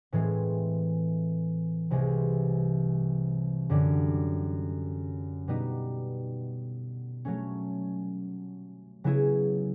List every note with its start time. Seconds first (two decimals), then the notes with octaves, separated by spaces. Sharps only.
0.12 A2 E3 G#3 C4
1.91 C2 C3 E3 G#3
3.70 F#2 D3 G3
5.48 B2 G3 B3 D#4
7.25 F#3 A3 C#4
9.04 C#3 F#3 B3 E4 G#4